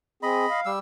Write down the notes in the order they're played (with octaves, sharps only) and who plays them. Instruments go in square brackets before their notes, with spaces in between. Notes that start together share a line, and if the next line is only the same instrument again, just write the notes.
[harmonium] C4 G#4 [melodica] D#5 B5
[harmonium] F5
[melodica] G3 E6